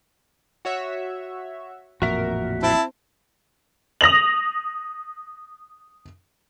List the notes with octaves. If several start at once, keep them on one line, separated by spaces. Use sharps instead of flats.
F#4 C#5 E5
A1 F2 A#2 F#4 A#4 E5
C4 E4 A5
D#6 A#6 F7 F#7